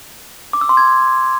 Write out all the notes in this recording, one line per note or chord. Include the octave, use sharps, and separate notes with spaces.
D6
E6
C6
G#6